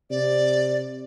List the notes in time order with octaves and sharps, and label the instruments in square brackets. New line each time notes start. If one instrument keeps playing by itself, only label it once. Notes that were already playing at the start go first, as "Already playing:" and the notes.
[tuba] C3 [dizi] D5